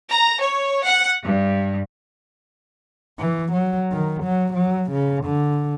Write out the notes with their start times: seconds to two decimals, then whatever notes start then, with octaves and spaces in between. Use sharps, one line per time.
0.10 A#5
0.39 C#5
0.83 F#5
1.24 G2
3.19 E3
3.53 F#3
3.92 D#3
4.23 F#3
4.53 F#3
4.91 C#3
5.24 D3